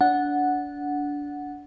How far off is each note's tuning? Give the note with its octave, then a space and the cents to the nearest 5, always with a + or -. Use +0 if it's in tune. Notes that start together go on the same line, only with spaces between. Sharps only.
D4 -20 F#5 -5